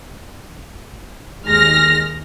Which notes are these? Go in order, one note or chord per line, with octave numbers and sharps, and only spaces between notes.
D#2 G#3 F6 A#6